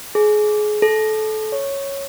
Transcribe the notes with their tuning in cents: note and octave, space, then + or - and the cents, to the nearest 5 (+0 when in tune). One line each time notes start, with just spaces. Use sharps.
G#4 +25
A4 -25
C#5 -5